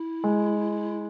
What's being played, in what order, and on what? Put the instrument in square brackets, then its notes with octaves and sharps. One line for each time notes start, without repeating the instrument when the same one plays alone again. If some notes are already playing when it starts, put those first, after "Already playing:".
Already playing: [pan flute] E4
[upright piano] G#3